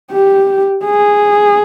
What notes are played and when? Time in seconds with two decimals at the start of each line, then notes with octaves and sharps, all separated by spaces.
0.11 G4
0.85 G#4